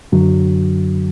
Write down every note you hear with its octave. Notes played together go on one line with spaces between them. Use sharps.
F#2 D3 F#3